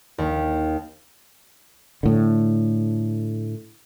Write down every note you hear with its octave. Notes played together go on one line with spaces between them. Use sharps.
D#2
A2 D3